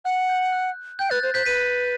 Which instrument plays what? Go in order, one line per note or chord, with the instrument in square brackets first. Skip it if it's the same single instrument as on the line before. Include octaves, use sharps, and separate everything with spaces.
[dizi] F#5 [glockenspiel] F#6
[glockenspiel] G6
F#6
[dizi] G5 [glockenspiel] G6
[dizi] B4 [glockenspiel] F#6 A6
[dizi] C5 [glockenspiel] G6
[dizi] C5 [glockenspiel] G6 B6
[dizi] B4 [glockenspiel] B6 D#7